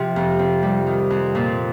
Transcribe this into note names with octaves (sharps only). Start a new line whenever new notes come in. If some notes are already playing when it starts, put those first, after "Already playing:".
Already playing: C3 F3 C4
F2
C4
G3
D#3
F2
A#2